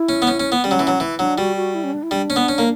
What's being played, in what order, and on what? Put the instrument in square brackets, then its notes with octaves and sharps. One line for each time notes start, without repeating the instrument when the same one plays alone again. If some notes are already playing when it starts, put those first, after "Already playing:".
Already playing: [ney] E4
[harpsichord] C#4
B3
C#4
C#4
B3
[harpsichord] G3 [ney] C#4
[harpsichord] F#3
E3
F#3
E3
[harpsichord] F#3 [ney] D4
[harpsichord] G3 [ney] F#4
[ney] F#4
E4
C#4
D4
E4
[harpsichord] G3 [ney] D4
[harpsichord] C#4
B3
C#4
A#3